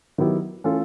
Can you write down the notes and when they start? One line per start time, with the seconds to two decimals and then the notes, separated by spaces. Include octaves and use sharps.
0.18 D#3 F#3 B3 E4 G4
0.64 E3 A3 C#4 F4 A4